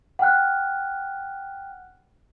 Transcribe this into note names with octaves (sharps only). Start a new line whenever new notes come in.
F#5 G5 F6 F#6